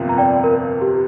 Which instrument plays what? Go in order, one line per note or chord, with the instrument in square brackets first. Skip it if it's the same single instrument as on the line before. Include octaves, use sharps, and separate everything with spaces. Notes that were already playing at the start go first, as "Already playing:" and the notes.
Already playing: [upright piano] G1 F2 C3 A#3 F4
[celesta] A#5
D5 G5
A#4
G4